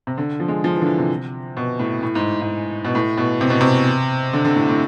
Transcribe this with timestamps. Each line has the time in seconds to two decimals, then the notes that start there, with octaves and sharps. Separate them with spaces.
0.07 C3
0.18 D3
0.40 F3
0.48 G#3
0.64 F3
0.76 E3
0.82 D3
0.87 E3
0.98 C3
1.57 B2
1.79 A2
2.03 A2
2.15 G#2
2.42 G#2
2.85 B2
2.95 A2
3.17 B2
3.41 C3
3.50 B2
3.61 C3
4.33 D3
4.45 D3
4.56 A2
4.68 A2